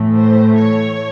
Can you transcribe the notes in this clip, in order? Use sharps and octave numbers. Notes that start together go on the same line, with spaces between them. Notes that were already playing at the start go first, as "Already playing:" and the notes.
Already playing: A2 E3 A3
C5
C#5